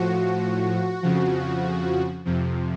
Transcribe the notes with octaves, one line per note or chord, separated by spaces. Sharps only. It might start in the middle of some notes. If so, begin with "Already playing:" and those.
Already playing: A2 F3 F#4
F2 C#3 F3
F2 C3 F3